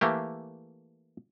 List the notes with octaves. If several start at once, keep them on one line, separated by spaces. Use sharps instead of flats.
E3 A3 A#3 G4